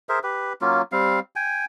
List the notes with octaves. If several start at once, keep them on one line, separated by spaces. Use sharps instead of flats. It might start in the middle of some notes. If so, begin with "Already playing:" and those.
G#4 A#4 C5 E5
G4 B4
F#3 A#3 C#4 F4
G3 C4 F5
G5 G#5